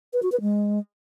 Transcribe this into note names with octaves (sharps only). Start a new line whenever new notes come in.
B4
F#4
B4
G#3